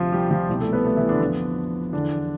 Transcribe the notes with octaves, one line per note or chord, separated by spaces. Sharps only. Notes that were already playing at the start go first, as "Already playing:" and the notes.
Already playing: D2 C3 F3 F4
G3 G4
F3 F4
C2 B2 G3 G4
A3 A4
B3 B4
A3 A4
E3 E4
D3 D4
F2 D3 F3 B3
E2 D3 F3 D4